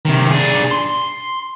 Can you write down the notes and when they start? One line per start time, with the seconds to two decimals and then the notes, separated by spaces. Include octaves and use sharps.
0.05 C3 D#3
0.30 D4 G#4
0.71 C6